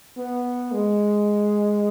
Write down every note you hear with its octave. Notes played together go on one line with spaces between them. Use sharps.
B3
G#3